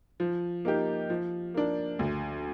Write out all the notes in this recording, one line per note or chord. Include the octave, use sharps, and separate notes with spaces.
F3
A#3 D#4 G4
F3
A#3 D4
D2